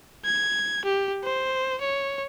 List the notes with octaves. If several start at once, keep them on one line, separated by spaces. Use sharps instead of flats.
G#6
G4
C5
C#5